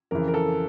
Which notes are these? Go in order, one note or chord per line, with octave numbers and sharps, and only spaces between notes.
F2 C#3 E3 A#4
A#4
A4